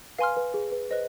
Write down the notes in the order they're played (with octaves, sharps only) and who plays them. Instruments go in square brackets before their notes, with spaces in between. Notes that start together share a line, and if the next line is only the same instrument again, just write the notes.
[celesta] B4 [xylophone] F5 G#5 C6 F6
[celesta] B4
G#4
B4
[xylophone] B4 D#5 [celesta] C5